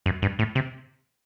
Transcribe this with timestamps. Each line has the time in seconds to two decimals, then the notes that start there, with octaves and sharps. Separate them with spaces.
0.06 F#2
0.22 G2
0.39 A2
0.55 C3